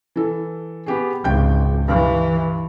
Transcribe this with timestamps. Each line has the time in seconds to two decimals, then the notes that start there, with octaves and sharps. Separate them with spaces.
0.16 E3 A4
0.86 B3 G4 G#4
1.24 G#1 C#2 G5 G6
1.88 G2 E3